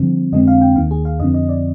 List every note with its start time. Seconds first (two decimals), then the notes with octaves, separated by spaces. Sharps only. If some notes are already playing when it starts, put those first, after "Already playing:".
Already playing: G2 D3 F3 C4
0.32 F2 D3 G#3 C4 D#5
0.47 F5
0.61 G5
0.76 D#2 D#3 A#3 F5
0.91 G#4
1.05 F5
1.20 F2 D3 F3 C4 D#5
1.34 D#5
1.49 D5